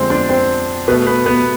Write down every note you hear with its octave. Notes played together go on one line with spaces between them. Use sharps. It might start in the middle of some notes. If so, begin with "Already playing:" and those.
Already playing: F2 D3 G#3 C4 C5
D4 D5
C4 C5
B2 A3 B3 B4
B3 B4
B3 B4